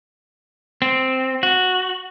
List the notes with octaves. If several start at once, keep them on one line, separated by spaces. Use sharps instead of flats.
C4
F#4